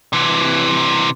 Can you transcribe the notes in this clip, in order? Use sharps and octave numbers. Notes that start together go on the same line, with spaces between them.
C3 E3